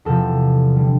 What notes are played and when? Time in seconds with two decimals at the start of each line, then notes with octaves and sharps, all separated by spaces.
0.05 E2 C3 F3 A4
0.76 D3 G3